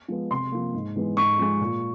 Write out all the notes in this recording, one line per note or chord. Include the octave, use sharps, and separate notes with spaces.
F3 G#3 B3
C3 C6
F3 A#3
G#2
E3 G#3 B3
G#2 C#6
F3 G#3
A#2